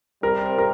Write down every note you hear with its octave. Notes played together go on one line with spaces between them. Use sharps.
C3 G3 C4 A#4
A#4